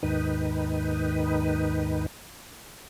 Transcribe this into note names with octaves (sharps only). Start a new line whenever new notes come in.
D#2 G#2 D#3 D#4 B4